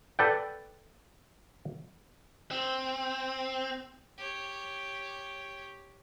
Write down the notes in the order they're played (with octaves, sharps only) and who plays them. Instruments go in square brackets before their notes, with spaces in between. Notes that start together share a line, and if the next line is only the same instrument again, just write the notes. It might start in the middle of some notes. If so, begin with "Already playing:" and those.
[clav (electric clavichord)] A4 B4 D5 F#5 G5
[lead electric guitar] C4
[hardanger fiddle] G4 C#5